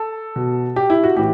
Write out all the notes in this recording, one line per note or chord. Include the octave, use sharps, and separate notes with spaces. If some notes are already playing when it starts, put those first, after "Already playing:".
Already playing: A4
B2
G4
E4
F#4
A2 E3 G4